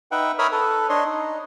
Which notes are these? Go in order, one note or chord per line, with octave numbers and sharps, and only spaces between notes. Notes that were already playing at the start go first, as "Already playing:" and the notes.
D#4 B4 E5 F#5 G5
A#4 C#5 E5 B5 D#6 F6
A4 B4
D4 C#5 D#5 C6
D#4